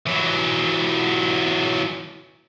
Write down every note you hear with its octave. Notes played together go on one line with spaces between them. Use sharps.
E3 F#3